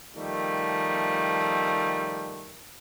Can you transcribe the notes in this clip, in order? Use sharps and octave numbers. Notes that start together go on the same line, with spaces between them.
D#3 F3 G3 A3